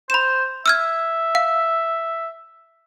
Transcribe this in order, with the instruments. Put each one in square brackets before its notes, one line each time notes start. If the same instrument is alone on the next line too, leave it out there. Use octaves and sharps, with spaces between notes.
[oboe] C5 [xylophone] B5 E7
[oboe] E5 [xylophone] E6 F6 G#6
[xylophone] F5